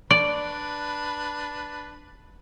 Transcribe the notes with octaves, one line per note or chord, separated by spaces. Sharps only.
D4 B4 D5